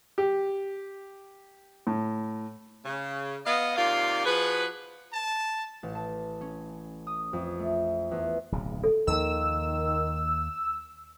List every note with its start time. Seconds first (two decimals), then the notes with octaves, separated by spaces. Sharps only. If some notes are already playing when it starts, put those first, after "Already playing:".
0.18 G4
1.87 A2
2.86 C#3
3.45 B3 D#5 F5
3.77 C3 D#3 A#3 F4 D5 F5
4.25 F3 F#4 G#4 B4
5.12 A5
5.83 A1
5.95 A5
6.41 C#4
7.07 D#6
7.33 F2
7.59 A3
8.11 E2
8.52 D1 B1 C#3
8.84 A4
9.07 D#2 D#3 F3 A#3 A#4 E6